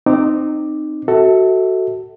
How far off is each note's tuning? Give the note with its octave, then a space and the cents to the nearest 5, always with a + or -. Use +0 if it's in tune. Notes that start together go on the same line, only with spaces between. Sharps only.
C4 +0 D#4 -20 D6 +0
F#4 +20 A4 +15 E5 -30